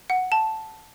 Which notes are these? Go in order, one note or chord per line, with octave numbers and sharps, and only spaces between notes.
F#5
A5